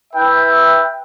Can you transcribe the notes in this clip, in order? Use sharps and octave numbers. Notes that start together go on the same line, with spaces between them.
E4 B4 E5 G5